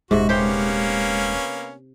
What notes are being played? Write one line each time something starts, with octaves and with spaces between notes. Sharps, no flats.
D#1 G#2 C3 G#3 F#4
A#3 B3 C#4 G4 C5 G5